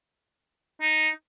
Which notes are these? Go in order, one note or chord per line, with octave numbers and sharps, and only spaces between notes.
D#4